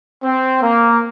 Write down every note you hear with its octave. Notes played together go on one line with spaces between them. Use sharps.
C4
A#3